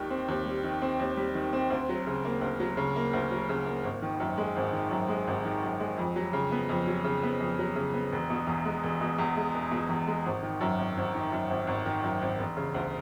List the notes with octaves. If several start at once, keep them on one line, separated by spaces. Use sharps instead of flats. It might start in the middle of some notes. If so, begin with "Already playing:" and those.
Already playing: D#2 D#3 G3
C4
D#2
G3
D#3
C4
D#2
G3
D#3
C4
D2
F#3
C#3
A#3
D2
F#3
C#3
A#3
D2
F#3
C#3
A#3
G#1
D#3
F#2
G#3
G#1
D#3
F#2
G#3
G#1
D#3
F#2
G#3
F2
F#3
C#3
B3
F2
F#3
C#3
B3
F2
F#3
C#3
B3
E1
B2
E2
G#3
E1
B2
E2
G#3
E1
B2
E2
G#3
G#1
D#3
F#2
G#1
G#1
D#3
F#2
G#1
G#1
D#3
F#2
G#1
E1
C#3
D2